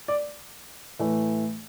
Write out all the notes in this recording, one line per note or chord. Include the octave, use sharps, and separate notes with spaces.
D5
A2 E3 A3